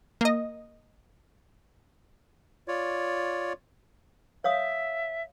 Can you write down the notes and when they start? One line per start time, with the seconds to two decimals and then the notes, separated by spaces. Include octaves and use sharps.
0.21 A#3 D#5
2.68 F4 C#5 D5
4.44 C#5 E5 F5 D#6